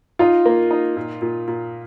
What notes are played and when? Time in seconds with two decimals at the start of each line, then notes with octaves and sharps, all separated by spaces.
0.19 D#4 F4
0.46 A#3
0.71 D#4
0.97 A#2
1.22 A#2
1.48 A#2